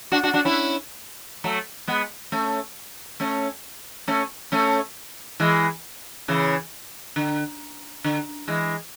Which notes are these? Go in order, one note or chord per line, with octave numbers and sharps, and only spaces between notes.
D4 F#4
D4 F#4
D4 F#4
C#4 E4
F#3 A3
G#3 B3
A3 C#4
A3 C#4
A3 C#4
A3 C#4
E3 G#3
C#3 E3
D3
D3
E3 G#3